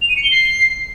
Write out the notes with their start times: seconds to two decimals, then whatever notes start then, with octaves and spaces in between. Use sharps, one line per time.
0.02 F7
0.09 D#7
0.16 C#7
0.24 G7
0.31 C7